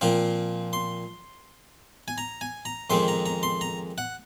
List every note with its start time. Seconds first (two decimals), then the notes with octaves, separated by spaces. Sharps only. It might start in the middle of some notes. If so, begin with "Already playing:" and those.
0.01 A#2 F3 C4 F5
0.73 C6
2.08 G#5
2.18 A#5
2.41 G#5
2.65 A#5
2.90 F2 D#3 G#3 C4 C6
3.08 A#5
3.26 A#5
3.43 C6
3.61 A#5
3.98 F#5